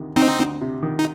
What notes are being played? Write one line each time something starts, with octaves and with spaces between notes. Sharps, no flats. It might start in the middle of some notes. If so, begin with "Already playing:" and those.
Already playing: D2 C3 D#3
D2 C4 D#4
D2
C3
D#3
D#4